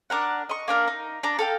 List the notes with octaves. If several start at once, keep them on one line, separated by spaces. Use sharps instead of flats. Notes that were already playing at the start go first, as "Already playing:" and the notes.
D4 A#4 F#5
D#5 C#6
A#3 D4 A#4
D#4
D4 A#5
A4 F5 G5